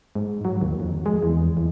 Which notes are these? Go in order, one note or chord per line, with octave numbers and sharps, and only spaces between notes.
G#2
F#3
D#2
F2
G#3
E2
E2